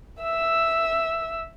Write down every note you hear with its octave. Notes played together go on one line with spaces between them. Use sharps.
E5 E6